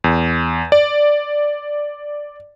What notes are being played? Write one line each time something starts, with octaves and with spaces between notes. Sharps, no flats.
E2
D5